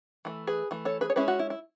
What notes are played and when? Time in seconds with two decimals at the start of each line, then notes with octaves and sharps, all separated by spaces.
0.25 E3 A3
0.47 G#4 B4
0.71 E3 A3
0.85 A4 C#5
1.01 G#4 B4
1.10 C#5
1.16 G#3 C#4 E4 G#4 B4
1.28 F#4
1.39 E4
1.50 E4